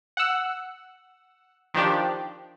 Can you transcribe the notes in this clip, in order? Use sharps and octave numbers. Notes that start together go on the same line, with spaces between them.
F#5 E6
D#3 F3 D4 G4